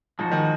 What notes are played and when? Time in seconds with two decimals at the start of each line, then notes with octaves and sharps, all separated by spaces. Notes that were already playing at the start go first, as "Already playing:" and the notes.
0.19 F3 G#3 D#4 F#4
0.31 D#3